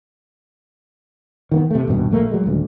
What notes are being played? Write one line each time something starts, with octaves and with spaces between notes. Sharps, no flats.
D#3 A#3 B3
C3 A3
D#1 G2 B2
A#1 A3 A#3
F#3 G#3
D#1 D2